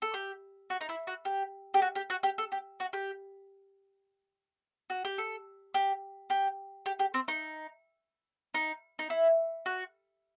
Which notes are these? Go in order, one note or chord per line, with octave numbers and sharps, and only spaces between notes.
A4
G4
F#4
D#4
E4
F#4
G4
G4
F#4
G4
F#4
G4
A4
G4
F#4
G4
F#4
G4
A4
G4
G4
G4
G4
C4
D#4
D#4
D#4
E4
F#4